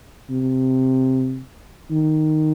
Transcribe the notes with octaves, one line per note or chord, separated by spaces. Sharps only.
C3
D#3